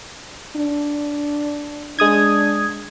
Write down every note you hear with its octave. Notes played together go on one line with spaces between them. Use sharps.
D4
G#3 D4 D#6 G#6